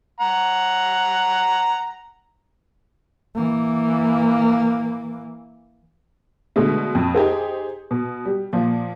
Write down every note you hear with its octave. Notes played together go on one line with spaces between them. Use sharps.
F#5 A#5
E3 A#3
B2 D3 G#3 A3
F2
D#4 G4 G#4 C5
B2
G3
A#2 F3